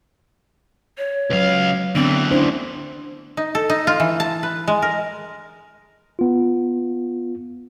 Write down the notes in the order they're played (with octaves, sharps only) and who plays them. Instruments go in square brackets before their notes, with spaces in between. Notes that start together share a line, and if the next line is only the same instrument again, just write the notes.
[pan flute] C#5
[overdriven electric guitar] C#2 F5 [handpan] F#3 B4
[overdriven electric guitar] D2 E3 [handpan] D3 B3 D4 [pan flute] C4
[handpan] C#4 D4 C5 [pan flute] E4
[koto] D#4
A4
D#4
F4
E3
A5
B4
G#3
A#4
[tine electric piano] B3 F4